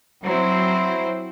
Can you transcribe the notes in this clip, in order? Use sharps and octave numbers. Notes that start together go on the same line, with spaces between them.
F#3 C4 E4 C5